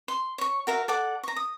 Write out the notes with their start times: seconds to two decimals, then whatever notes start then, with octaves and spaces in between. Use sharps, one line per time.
0.08 C6
0.38 C#5 C#6
0.67 F#4 A#4 E5 F5
0.88 A4 D5 F#5
1.23 A#5 C#6
1.36 D#6